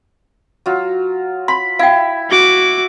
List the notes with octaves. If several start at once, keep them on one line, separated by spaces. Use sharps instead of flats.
F#3 F4
B5 C6
E4 F5 G5
F#4 D6